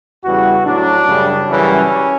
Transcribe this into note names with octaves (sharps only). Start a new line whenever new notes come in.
E2 C#3 E3 G3 F#4
A2 F#3 D4
F#2 C#3 G3
F#2 C#3 E3 G3 C#4